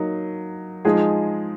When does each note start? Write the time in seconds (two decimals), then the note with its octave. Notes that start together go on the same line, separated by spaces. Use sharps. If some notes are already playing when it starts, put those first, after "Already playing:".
Already playing: F#3 A#3 D#4
0.85 F3 G#3 D#4 G#4